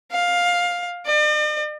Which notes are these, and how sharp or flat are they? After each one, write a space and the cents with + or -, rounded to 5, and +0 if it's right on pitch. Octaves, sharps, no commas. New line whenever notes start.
F5 +15
D5 +45